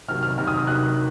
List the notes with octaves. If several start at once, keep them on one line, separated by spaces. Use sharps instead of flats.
C3 D#3 F#3 F6
F6
C3 D#3 F#3 F6
D#6
D#6
C3 D#3 F#3 F#6